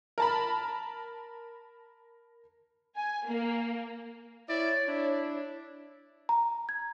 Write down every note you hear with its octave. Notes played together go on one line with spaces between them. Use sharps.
A#4 A5 B5
G#5
A#3
E4 C#5 D5
D4 E4
A#5
G#6